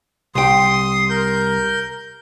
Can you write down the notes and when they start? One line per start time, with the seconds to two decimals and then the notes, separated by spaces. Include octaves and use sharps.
0.35 C2 G5 C6 D#6
1.10 A#4 G6